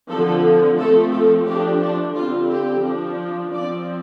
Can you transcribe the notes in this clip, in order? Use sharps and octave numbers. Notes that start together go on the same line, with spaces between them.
D3 F3 C4 A4
F3 A3 C4 A4
A4
F3 A3 D4 G4
D4
D3 G3 C4 F4
G4
F3 D4
F3 C4 D5